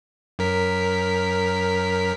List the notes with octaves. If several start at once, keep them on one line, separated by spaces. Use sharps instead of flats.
F#2 A#4 B6